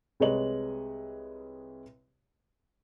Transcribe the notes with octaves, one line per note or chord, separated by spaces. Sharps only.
C2 G#3 B4 C#5 D#5 F#7